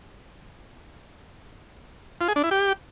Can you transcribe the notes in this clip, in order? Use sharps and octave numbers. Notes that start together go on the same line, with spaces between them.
F4
G#4
D4
E4
G4